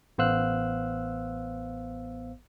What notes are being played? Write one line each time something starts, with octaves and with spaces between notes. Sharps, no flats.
A1 B3 C5 F5 E6 F#6